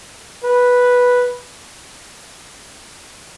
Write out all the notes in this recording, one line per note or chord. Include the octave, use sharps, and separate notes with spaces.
B4